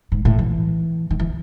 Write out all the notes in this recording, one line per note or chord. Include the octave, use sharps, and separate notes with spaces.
G#2
A2
E3
D#3
E3